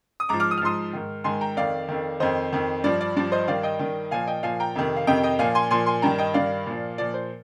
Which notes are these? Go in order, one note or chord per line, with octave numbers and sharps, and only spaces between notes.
D#6
G#2 F3 A#5 D6
D6 F6
D#6
F6
G#2 F3 C6 D#6
G#2 D#3
G#2 D#3 G#5 C6
G5 A#5
F2 D#3 D5 F5
F2 D#3
F2 D#3 C5 D#5
F2 D#3
G2 F3 D5
D5
G2 F3 D5
C5 D#5
G2 D#3 D5 F5
D#5 G5
G2 D#3
A#2 F3 F5 G#5
D#5 G5
A#2 F3 F5 G#5
G5 A#5
F2 C3 D#3
F5
F2 C3 D#3 D#5 G5
D#5 G5
A#2 F3 F5 G#5
G#5 C6
A#2 F3 G#5 C6
G#5 C6
G2 D#3 G5 A#5
D#5 G5
G2 D#3 D5 F5
A#2 F3
A#2 F3 D5
C5